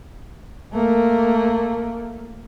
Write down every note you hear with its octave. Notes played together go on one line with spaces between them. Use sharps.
A3 A#3